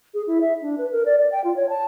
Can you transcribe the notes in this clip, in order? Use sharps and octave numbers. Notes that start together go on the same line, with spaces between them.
G#4
E4
E5
D4
B4
A#4
D5
D5
G5
F4
C#5
A5